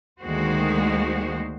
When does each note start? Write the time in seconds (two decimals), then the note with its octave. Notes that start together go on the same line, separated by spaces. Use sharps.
0.21 D2 D#3 G#3 A#3 F#4 C5